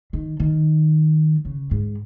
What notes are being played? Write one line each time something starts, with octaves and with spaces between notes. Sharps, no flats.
D#3
D#3
C#3
G#2